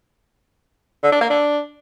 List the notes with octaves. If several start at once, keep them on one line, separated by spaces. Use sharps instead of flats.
D3
D4
A#3
D4